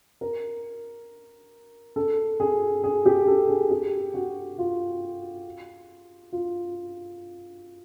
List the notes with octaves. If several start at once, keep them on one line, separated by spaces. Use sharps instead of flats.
A#4
A4
G#4
G#4
G4
A4
G#4
G4
F#4
F4
F4